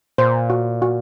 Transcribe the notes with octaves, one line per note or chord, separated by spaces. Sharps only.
A#2 C5
F#4
F#4